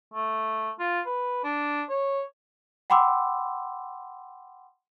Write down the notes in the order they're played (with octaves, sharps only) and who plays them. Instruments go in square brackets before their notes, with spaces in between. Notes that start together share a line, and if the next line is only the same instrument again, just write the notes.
[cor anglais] A3
F4
B4
D4
C#5
[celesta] F#5 G5 B5 C6 D6 E6